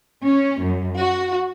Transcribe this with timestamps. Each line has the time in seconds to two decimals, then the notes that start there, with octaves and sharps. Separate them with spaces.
0.23 C#4
0.63 F#2
0.98 F#4